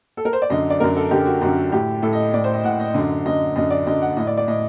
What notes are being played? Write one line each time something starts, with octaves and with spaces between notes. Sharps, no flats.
A4
A#4
C5
D5
F#2 D3 D#5
D5
F#2 D3 A#4
A4
F#2 D3 G4
F#4
F#2 D3 F#4
A2 G4
A2 A4
D#5
A2 D5
C5
D#5
A2 F#5
D#5
F#2 D3
F#2 D3 D#5
F#2 D3 D#5
D5
F#2 D3 D#5
F#5
A2 D#5
D5
D5
A2 D#5